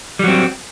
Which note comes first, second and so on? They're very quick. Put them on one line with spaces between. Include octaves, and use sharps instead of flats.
G3 F#3 C4